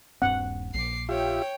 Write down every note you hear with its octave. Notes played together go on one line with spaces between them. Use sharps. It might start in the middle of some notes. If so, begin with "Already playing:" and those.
D#1 G2 C4 F#5
A#1 D6 C7
F4 G4 C#5 E5 G5